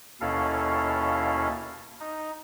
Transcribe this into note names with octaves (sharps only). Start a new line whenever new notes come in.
D#2 B2 C#4 E4 A4 F5
D#4